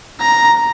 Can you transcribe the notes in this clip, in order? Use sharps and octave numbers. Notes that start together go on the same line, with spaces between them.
A#5